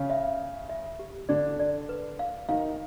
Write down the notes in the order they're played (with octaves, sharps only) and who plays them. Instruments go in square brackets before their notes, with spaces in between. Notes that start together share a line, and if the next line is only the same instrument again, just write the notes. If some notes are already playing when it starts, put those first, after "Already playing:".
Already playing: [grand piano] C#3 C#4
[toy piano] E5
E5
E5
G4
[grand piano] D3 D4 [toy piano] D5
[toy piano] D5
B4
F5
[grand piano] D#3 D#4 [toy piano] F5